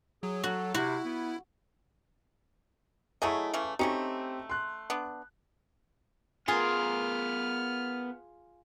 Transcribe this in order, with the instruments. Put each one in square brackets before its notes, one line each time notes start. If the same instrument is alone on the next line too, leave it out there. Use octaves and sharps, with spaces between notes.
[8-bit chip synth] F#3 [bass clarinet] G#4
[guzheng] F#4 [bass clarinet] A4
[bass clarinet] C3 [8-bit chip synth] E4 [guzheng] F#4
[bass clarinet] B3
[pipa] F#3 A3 D#5 [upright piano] E4 G#4
[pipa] C#3 E3 A3
[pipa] A3 C#4 D#4 [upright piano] C4 G4
[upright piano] C6 F#6
[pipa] B3 D4
[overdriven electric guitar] B3 A#4 [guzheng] F4 G#4 [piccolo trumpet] F6